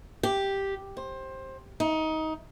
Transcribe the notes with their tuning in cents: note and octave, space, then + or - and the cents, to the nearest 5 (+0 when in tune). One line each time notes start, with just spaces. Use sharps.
G4 +0
C5 +20
D#4 +20